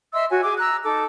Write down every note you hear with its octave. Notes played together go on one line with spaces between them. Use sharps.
D#5 E5 C6 E6
F#4 C#5 G#5
G#4 G#5 D6
A#5 E6 F#6
D#4 A4 D6